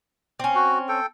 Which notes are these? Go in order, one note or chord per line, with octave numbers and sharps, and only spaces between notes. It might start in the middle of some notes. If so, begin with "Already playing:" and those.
C4 C#4
F#4
A4 G5